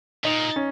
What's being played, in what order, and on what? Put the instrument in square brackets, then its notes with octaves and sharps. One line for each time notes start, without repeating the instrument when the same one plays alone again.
[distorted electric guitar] A#2 [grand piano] D#4
[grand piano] C#4